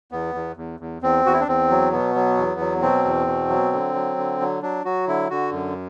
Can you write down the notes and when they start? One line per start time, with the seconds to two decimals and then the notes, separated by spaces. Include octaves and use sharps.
0.11 E2 B3
0.35 E2
0.57 E2
0.80 E2
1.02 E2 C4
1.25 E2 F#4
1.33 E4
1.40 D4
1.47 E2 C4
1.70 F#3
1.92 B2 B3
2.15 F#3
2.37 E2
2.60 F#3
2.82 B2 C4
3.05 E2
3.27 B2
3.49 F#3
3.72 D3
3.95 F#3
4.17 D3
4.40 F#3
4.62 F#3 D4
4.85 F#3 F#4
5.08 D3 E4
5.30 D3 F#4
5.52 F#2